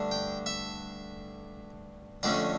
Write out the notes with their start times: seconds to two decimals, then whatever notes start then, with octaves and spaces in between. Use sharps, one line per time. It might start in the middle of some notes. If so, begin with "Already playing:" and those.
Already playing: G2 D3 A3 D4
0.11 G5
0.46 E5
2.23 F2 D3 A3 C#4 D5